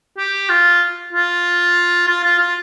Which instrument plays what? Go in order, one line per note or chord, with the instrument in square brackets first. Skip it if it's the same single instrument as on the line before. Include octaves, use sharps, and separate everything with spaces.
[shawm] G4
F4
F4
F4
F4
F4